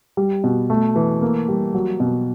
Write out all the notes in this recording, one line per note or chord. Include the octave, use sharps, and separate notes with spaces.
G3
B2
A3
E3
A#3
G3
F#3
B2